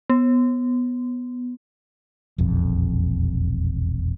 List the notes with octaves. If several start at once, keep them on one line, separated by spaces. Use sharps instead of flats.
B3
E1 A#1 F2